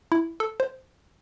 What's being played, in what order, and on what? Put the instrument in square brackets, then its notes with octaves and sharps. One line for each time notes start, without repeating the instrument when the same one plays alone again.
[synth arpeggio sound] E4
A4
C5